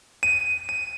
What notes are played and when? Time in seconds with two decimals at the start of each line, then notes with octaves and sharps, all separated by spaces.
0.23 D#7
0.69 D#7